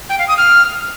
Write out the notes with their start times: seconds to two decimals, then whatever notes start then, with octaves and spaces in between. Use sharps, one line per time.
0.09 G5
0.19 F5
0.28 D#6
0.37 F6